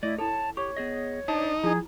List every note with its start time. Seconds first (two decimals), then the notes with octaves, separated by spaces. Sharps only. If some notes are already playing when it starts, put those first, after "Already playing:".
0.03 A3 E4 D5 D#5
0.18 E4 A4 C#5 A5
0.57 G4 C#5 C#6
0.77 B3 G#4 D#5
1.28 D4 D#4 C5 D5 A5
1.63 F3 E4 F4 G#4 A#5